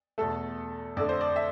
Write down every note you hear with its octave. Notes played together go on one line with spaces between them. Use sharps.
E2 B2 A3 A4
F2 D3 A3 D5
C5
D5
E5